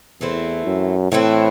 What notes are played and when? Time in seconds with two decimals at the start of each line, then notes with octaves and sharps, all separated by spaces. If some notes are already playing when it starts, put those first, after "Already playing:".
0.21 E2 E3 A3 C4 E4
0.66 F#2
1.12 A2 E3 A3 C4 E4